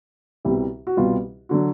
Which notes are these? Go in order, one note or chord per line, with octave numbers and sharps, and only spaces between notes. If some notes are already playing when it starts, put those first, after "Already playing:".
C2 B2 G3 E4
F#4
C2 B2 G3 F4
D3 F#3 F#4